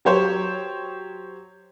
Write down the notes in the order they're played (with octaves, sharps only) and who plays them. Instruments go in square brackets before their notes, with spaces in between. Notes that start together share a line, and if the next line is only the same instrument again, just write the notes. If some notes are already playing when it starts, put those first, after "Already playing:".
[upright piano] F#3 G4 C5 C#5